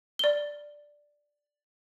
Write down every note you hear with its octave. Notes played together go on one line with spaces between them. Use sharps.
D5 G7